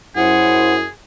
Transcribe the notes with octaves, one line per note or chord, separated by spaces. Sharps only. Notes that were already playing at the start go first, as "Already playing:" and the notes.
F#2 E4 G#4 C5 F#5